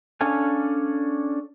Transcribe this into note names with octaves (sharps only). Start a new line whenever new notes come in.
C#4 D4 A4 F5 G#5